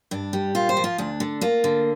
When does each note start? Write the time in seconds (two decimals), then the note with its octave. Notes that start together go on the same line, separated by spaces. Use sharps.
0.11 G2 D4
0.33 G3
0.55 A#2 F4
0.69 C5
0.77 F3
0.84 F4
0.98 D2 D4
1.20 D3
1.41 A#3 F4
1.64 D3